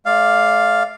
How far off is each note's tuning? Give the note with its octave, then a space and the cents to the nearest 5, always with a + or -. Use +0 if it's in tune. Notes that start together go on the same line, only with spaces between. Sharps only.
A3 -40 D5 +0 F5 +0